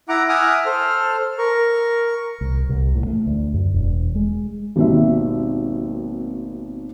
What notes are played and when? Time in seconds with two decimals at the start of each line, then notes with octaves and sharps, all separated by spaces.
0.09 E4 F#5 A#5 D6
0.29 E5 F#5 G#5 D6 D#6 F6
0.66 A4 C5 F6
1.38 A#4 C#6
2.41 C2
2.69 C2
2.95 A2
3.07 A3
3.26 D2
3.54 F#2
3.74 E1
4.15 G#3
4.76 G#1 D#2 B2 C4 D#4 E5